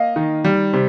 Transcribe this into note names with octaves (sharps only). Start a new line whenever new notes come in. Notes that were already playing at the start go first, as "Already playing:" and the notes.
Already playing: A#3 D#5 F5
D#3
G3
C3